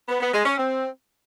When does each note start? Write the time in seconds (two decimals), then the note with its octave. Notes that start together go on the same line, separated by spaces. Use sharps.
0.09 B3
0.21 B3
0.33 G#3
0.45 C#4
0.57 C4